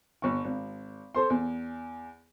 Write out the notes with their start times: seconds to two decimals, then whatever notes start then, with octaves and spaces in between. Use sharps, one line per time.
0.22 G1 C#6
0.45 G#1
1.15 A4 C5 C6
1.30 E2